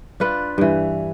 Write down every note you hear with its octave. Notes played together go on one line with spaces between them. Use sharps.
D4 F4 B4
G2 E3